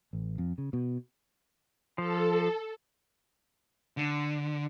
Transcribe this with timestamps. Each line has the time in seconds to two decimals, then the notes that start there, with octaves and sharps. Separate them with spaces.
0.13 A1
0.38 F2
0.58 C#3
0.73 B2
1.98 F3 A4
3.97 D3